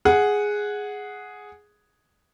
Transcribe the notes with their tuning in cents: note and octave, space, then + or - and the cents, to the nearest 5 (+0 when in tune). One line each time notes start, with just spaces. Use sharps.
G#4 +0 F#5 -5